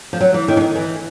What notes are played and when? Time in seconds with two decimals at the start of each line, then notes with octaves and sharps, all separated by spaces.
0.13 F3
0.21 F#3
0.34 E3
0.48 D#3
0.57 E3
0.61 D#3
0.75 E3